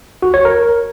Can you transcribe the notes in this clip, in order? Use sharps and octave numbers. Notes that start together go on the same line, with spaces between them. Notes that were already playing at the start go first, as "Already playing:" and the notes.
F#4
C#5
A#4